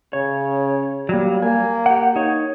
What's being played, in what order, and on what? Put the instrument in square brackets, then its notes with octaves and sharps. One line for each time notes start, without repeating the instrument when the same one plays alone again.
[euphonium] C#3 [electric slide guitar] C#5
[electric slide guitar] F#3 A#3 [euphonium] G3
[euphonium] A#3 [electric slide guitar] G#5
[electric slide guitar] G4 F#5
D#4 C#5